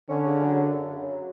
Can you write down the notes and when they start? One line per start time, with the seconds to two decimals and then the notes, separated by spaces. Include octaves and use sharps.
0.09 D3 C#4
0.25 C#3
0.42 F#3
0.59 F#2
0.75 F#2
0.91 C#3
1.08 F#3